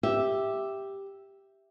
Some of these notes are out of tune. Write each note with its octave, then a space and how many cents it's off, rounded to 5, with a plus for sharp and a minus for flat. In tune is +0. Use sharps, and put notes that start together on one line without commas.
G4 +0 E5 +0